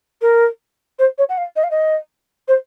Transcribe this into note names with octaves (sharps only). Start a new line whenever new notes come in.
A#4
C5
C#5
F#5
F5
D#5
F5
D#5
C5